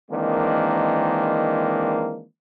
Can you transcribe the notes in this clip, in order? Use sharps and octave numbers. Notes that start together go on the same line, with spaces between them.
D#3 E3 G#3 A#3 C4 D4